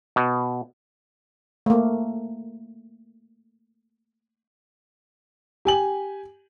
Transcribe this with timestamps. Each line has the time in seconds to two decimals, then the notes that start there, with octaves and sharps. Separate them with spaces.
0.16 B2
1.66 A3 A#3
5.65 G4 G#5 F#7